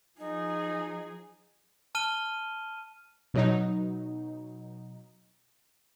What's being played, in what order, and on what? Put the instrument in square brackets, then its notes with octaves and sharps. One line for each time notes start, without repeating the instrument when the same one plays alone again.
[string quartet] F3 G#4 [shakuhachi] D#4
[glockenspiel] A5 F6 D#7 G7
[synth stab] B2 F#3 D#4